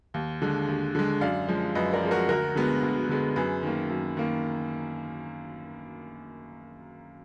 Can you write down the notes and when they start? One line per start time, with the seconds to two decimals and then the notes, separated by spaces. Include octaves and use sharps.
0.14 D#2
0.42 D3 G#3
0.68 D#2
0.95 D3 G#3
1.21 F#2 D5 F5
1.48 F3 G#3
1.75 F#2 B4 D#5
1.93 A#4 D5
2.02 F3 G#3
2.11 F#4 A#4
2.29 D2 F#4 A#4
2.55 D3 G#3 B3
2.83 D2
3.09 D3 G#3 B3
3.36 F#2 G#4 B4
3.63 D#3 A#3
3.89 F#2
4.17 D#3 A#3